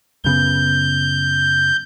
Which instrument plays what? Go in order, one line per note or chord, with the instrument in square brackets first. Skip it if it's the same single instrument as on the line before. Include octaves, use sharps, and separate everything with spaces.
[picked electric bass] F#2 C#3 B3 [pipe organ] G6